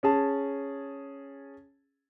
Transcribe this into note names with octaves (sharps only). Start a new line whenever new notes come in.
C#4 G#4 A5